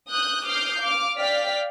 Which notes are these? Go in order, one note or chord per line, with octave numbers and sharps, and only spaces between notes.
D#6 F#6 G6
D6 D#6 F6 G6 C7
F5 D6 F6
D5 F5 G5 F6 B6